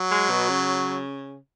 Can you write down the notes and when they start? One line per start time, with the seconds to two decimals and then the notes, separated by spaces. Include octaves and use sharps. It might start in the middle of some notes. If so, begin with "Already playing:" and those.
Already playing: F#3
0.11 G#3
0.30 B2
0.49 C#3